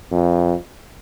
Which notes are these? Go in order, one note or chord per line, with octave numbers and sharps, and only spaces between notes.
F2